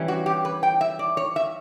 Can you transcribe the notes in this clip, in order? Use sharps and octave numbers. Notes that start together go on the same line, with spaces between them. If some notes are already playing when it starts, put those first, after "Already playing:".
Already playing: E3 G3 C#4
F#4
G4
B4
G5
E5
D5
C#5
E5